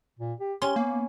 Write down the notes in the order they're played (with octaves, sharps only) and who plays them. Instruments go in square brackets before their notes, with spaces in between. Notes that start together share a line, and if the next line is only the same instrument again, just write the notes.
[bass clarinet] A#2
G4
[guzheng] C#4 [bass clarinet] G4 [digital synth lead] C6
[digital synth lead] A#3 [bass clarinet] B3